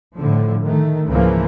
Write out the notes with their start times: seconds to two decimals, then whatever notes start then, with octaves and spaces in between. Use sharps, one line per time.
0.18 A2 D3 F3
0.63 D#3 A3
1.09 C#2 G#2 C#3 E3 F3 A#3